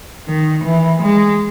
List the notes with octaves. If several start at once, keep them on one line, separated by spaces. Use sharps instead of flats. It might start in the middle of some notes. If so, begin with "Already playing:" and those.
D#3
E3
G#3